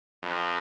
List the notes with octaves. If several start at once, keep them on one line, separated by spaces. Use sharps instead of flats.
F2